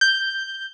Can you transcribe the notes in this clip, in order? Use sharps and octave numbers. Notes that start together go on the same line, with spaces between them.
G6